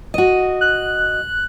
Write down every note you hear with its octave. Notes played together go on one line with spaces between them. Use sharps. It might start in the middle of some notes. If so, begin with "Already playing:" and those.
F#4 D#5
F#6